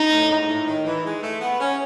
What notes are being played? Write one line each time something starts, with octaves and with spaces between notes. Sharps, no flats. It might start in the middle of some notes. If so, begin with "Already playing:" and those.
Already playing: D#4
A2
G#2
A2
D#3
E3
G#3
A3
B3
C#4